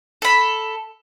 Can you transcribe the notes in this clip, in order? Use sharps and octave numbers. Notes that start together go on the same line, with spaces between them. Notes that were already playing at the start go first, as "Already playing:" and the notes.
A4 B5